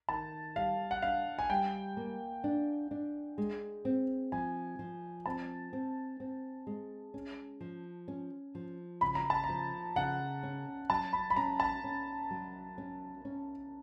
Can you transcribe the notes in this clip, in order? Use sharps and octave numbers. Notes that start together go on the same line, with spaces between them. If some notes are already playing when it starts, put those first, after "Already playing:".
D#3 A5
G3 F5
F#5
D4 F5
G#5
G3 G5
A#3
D4
D4
G#3
C4
F3 G#5
F3
C4 A5
C4
C4
G#3
C#4
F3
C#4
F3
C#3 B5
A#5
A5
A#5
F3
C#3 F#5
C#4
F#3 A5
B5
B5
C#4 A#5
A5
C#4
F#3
C#4
C#4